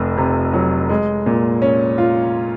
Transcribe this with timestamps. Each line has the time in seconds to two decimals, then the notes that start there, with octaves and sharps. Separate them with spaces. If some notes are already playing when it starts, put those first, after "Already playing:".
Already playing: F1 F2
0.18 C3
0.53 F#3
0.89 G#3
1.26 A#2
1.62 C#4
1.98 F4